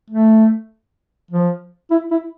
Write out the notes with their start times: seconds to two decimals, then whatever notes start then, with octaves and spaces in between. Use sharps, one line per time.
0.10 A3
1.31 F3
1.91 E4
2.11 E4